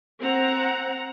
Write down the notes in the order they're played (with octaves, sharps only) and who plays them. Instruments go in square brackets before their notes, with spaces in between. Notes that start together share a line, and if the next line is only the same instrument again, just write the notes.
[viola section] C4 F#5 A#5